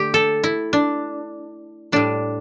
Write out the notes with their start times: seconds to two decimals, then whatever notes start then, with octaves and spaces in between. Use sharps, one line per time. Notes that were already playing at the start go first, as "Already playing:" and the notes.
Already playing: D3 A3 G4
0.14 A4
0.43 E4
0.73 D4
1.92 A2 G3 D4